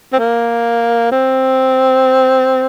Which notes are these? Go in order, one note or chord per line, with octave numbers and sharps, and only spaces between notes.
C4
A#3
C4